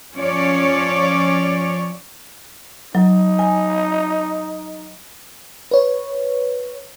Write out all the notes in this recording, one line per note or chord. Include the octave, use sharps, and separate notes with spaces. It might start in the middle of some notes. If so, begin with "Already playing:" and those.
F3 C#4 C#5 D5
F#3 D#4
G#5
B4 C#5